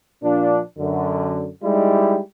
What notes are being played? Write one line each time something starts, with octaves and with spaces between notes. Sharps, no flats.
A#2 F3 D4
F#2 D3
G3 G#3 D#4 E4 G4